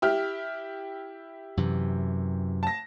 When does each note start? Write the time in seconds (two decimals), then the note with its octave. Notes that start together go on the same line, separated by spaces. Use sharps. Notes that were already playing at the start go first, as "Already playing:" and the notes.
0.02 E4 G4 F6
1.57 F#2 C3 E3
2.63 A5 A#6